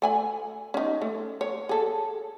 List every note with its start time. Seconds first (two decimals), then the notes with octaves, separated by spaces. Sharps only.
0.02 A3 G#5 B5
0.74 C#4 D#4
1.02 A3
1.41 C#5
1.69 G#4 A4